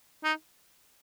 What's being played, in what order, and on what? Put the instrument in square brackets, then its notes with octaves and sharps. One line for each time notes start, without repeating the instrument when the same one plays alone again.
[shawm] D#4